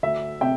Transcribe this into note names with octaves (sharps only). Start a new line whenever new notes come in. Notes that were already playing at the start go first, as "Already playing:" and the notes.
D2 E5
C3 E5 G5